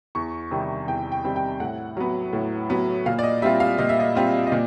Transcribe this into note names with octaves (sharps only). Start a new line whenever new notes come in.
E2 C#6
C3 D#3 G3 C4
E2 G5
G5
C3 D#3 G3 C4
G5
A2 F#5
F#3 B3
A2
F#3 B3
A#2 F5
D5
D#5
G3 C4 F4 E5
F5
A#2 D#5
E5
D#5
G3 C4 F4
D#5
A#2 D5